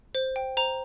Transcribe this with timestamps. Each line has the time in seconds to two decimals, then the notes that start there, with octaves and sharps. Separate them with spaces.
0.15 C5
0.36 G5
0.57 C5 A#5